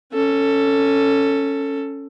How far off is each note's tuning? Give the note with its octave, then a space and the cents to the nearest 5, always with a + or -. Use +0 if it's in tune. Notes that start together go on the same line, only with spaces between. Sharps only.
C#4 +0 A4 +15